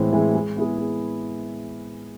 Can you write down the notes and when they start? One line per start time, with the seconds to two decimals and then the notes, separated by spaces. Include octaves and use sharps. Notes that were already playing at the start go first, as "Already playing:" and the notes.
Already playing: A2 E3 G#3 C4
0.13 E3 G#3 C4
0.34 G#3
0.56 B3 E4 G#4
0.78 G#3